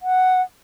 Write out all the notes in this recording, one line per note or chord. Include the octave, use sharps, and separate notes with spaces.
F#5